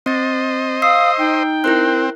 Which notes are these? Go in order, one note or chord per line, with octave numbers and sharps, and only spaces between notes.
C4 C5 D#5 A6
F5 D#6 E6 C7
D#4 G5
C4 E4 A#4 F#6